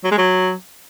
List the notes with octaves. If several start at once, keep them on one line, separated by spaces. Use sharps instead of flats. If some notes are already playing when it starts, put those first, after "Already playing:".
F#3
G#3
F#3